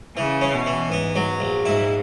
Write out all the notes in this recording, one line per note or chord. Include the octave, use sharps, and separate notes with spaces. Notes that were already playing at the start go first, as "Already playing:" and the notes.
C#3 E3
C#4
B2
E3
G#2 B3
F#3
A#1
G#2 E4